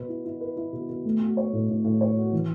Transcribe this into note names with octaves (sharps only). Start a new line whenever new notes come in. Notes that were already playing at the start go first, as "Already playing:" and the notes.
Already playing: B2 B4
E4
E4
B4
E4
B2
B2
A3
F#4
C#5
A2
A2
A2
C#5
F#4
E3